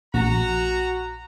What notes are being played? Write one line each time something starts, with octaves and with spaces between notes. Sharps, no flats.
A#1 F#4 A#5